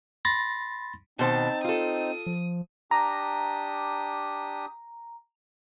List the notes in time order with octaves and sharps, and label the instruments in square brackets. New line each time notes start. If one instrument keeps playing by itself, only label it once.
[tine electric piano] B5 C6 A6 A#6
[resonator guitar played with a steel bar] B2 D#3 C5 [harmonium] C4 D#4 [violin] A5
[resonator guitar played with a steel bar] F4 A4 [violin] D#6
[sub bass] F3
[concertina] D4 G4 D#6 [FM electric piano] A#5